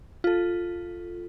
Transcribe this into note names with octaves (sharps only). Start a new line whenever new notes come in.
F4 A4